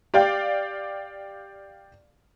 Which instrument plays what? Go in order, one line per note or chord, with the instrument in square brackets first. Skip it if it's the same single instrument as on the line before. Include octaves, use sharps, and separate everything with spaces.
[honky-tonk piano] G4 D5 F5 G5